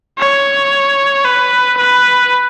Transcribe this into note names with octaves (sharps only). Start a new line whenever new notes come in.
C#5
B4
B4